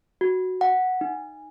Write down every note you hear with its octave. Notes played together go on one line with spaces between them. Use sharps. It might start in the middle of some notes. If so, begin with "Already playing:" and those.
F#4
F#5
D#4